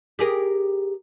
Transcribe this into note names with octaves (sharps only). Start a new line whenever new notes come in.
G4 G#4 A#4